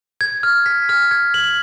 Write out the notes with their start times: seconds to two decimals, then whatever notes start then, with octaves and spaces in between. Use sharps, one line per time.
0.21 G#6
0.43 F6
0.66 B6
0.89 F6
1.11 G#6
1.34 F#7